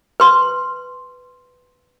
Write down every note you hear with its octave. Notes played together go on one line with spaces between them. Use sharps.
B4 C6